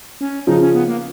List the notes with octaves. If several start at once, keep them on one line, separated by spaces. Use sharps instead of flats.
C#4
C#3 F3 D#4
C#4
B3
A#3